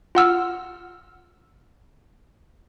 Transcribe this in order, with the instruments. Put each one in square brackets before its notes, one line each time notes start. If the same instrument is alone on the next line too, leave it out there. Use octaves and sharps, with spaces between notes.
[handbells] F4 F#5 E6 F6